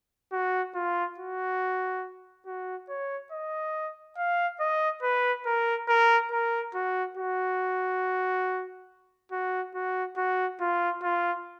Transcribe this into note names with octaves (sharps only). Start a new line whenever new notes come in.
F#4
F4
F#4
F#4
C#5
D#5
F5
D#5
B4
A#4
A#4
A#4
F#4
F#4
F#4
F#4
F#4
F4
F4